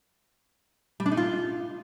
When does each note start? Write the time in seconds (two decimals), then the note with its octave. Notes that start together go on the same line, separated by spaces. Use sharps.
1.00 G3
1.06 D4
1.12 D#4
1.17 F4